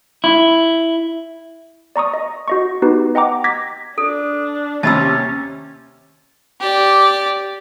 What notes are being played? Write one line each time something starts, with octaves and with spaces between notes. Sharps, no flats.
E4
D5 A#5 C#6 D#6
D#5
F#4 D#5 C#6
B3 D#4 F#4 G4 B4
D#5 F#5 G5 A#5 D6
D6 G#6 A#6 B6
D4 A4
D#2 C3 C#4 A5 B5 E6 A6
G4 D5